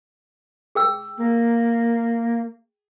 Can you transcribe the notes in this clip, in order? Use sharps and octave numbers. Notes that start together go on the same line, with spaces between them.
G#4 G5 E6
A#3